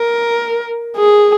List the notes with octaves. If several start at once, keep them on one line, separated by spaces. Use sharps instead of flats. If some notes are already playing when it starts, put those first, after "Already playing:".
Already playing: A#4
G#4